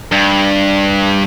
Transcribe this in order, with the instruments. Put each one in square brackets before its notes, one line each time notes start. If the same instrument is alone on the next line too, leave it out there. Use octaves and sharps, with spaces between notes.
[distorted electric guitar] G2